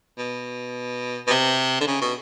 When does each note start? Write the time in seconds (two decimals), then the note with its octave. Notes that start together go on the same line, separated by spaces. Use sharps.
0.18 B2
1.27 B2
1.30 C3
1.81 D3
1.87 C#3
2.01 B2